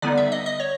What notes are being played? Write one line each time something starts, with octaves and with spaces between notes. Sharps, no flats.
D3 G3 B3 D#4 D5
E5
D#5
D#5
C#5